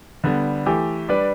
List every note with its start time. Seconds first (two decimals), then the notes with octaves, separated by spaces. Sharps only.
0.24 D3 G3 B3
0.66 E3 A3 G4
1.09 G3 D4 B4 D5